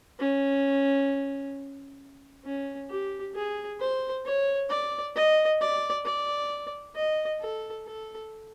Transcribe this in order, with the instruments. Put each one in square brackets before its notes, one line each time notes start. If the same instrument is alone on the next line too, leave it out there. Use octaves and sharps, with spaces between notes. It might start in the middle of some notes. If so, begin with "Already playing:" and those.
[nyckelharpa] C#4
C#4
G4
G#4
C5
C#5
D5
D#5
D5
D5
D#5
A4
A4